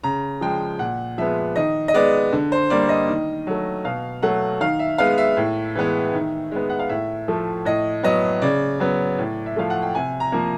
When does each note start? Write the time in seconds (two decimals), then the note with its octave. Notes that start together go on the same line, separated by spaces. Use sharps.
0.03 C#3 A#5
0.41 F3 G#3 G5
0.79 A#2 F#5
1.18 F3 G#3 B3 E5
1.56 D#3 D#5
1.88 D#5
1.94 G#3 B3 D5
2.33 D3
2.52 C5
2.70 G3 A#3 D5
2.89 D#5
3.09 D#3
3.47 F#3 A3
3.84 B2 F5
4.22 F#3 A3 F#5
4.60 D#3 F5
4.79 E5
4.98 G#3 B3 F5
5.18 E5
5.37 A2
5.75 E3 G#3 B3
6.13 D#3
6.51 G#3 B3
6.70 F#5
6.79 F5
6.89 A2 E5
7.28 F3 A3
7.65 A2 D#5
8.03 F#3 B3 D#5
8.42 C#3 D5
8.80 F#3 B3
9.19 A2
9.46 E5
9.56 F3 A3 F5
9.70 F#5
9.82 G5
9.95 C3 G#5
10.20 A#5
10.32 F3 A#3